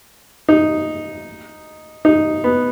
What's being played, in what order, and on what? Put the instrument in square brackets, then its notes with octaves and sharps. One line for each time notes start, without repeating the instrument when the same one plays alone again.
[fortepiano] D#4
D#4
B3